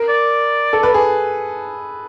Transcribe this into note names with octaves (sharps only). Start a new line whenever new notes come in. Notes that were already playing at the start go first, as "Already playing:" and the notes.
Already playing: A#4
D5
A4
B4
G#4